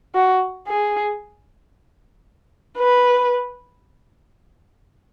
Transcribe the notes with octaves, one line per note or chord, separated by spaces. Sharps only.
F#4
G#4
B4